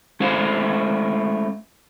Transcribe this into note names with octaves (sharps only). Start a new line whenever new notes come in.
G#3 A3 C#4 E4 C5 F5